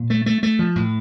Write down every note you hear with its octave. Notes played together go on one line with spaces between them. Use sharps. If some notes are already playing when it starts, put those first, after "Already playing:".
Already playing: A#2
A3
A3
A3
F3
A2